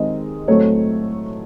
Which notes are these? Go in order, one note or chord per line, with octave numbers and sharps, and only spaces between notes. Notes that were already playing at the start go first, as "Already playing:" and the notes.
Already playing: D#3 G#3 C4 D#5
A2 F#3 A3 C4 C#5